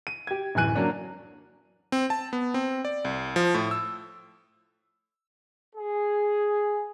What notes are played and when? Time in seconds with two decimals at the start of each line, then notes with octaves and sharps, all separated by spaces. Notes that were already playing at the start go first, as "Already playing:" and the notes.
0.07 D#7
0.27 G4 G#6
0.55 D1 F#2 E3 G#5 F#6 D#7
0.75 F#3 A#3 C#4 D4
1.92 C4
2.10 A5
2.33 B3
2.54 C4
2.85 D5
3.05 C2
3.36 F3
3.54 A2
3.71 E6
5.76 G#4